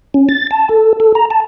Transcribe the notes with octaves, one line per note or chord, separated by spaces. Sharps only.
C#4
A6
A5
A4
A4
A#5
A5